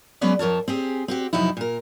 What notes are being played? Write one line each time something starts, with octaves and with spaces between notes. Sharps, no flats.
F#3 G#3 B3 C#4 B4 D5
F2 A#4 C#5 A5
C4 G4 G#4
C4 F#4 G4
F2 C3 F#3 D#4 E4
A#2 A#4